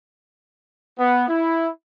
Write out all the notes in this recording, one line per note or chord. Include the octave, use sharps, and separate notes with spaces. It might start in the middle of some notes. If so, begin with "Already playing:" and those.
B3
E4